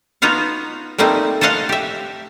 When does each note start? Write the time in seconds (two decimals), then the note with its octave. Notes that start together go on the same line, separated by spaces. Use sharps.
0.22 B3 D#4 F4 F#4 F5
0.98 G3 A3 A#3 C4 D#4
1.41 A4 C5 D#5 F5 F#5
1.69 G4 E5